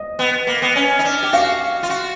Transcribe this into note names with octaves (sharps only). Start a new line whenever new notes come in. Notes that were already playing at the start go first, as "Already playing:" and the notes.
Already playing: D#5
B3
A#3
B3
C#4
D#4
D4
G4
F#4 F5
F4
F#4